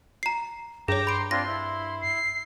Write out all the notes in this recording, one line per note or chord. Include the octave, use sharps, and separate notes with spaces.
A#5 C7
G2 G#4 C#5 G5 A#5 D6 A#6
B5 C6 D7
C4 D4 F4 C6 A#6
E4
C7